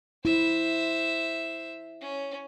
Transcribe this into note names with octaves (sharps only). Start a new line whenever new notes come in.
E4 C5 E5
C#4